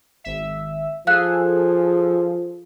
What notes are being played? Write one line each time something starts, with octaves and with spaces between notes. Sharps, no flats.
G#1 E5
F3 G#4 A4 F5 F#6